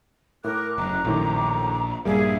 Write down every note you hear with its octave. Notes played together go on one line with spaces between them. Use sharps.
A2 A#4 D6 F#6
F#1 A#5
A#1 F#2 A2 D#3 D6
A#1 G2 G3 A#3 G#4 E5